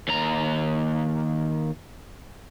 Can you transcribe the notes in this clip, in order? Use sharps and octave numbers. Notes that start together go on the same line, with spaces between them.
D#2 A#5